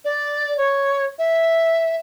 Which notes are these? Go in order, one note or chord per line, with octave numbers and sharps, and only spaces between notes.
D5
C#5
E5